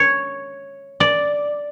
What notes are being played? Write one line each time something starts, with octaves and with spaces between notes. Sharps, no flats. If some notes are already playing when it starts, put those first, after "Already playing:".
Already playing: C#5
D5